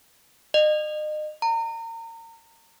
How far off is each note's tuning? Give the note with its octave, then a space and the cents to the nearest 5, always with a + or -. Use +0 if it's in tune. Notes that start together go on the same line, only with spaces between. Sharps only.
D#5 -35
A#5 -35